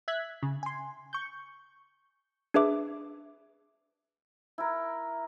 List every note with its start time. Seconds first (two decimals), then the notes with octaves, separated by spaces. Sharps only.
0.08 E5 F#6 G#6 B6
0.43 C#3
0.63 G#5 C6
1.13 C#6 G6
2.54 D4 G#4 B4 E5 D6
4.58 E4 A#4